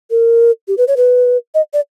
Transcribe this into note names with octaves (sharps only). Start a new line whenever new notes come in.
A#4
G4
B4
C#5
B4
D#5
D5